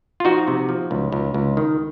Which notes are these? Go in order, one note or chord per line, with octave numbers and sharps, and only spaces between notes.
F4
F3 D#4 F#4
C3
F3
C#2
C#2
C#2
D#3